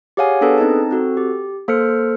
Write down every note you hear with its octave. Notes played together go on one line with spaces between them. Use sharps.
G4 G#4 C#5 F5 F#5 G#5
B3 D4 G#4 A4 B4 A5
C4 D#4 D#5 A5
C4 F#4 A4
G4
A#3 A4 C5 F6 C#7